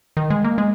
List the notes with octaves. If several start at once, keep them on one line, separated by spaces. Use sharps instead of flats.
D#3
G#3
A#3
G#3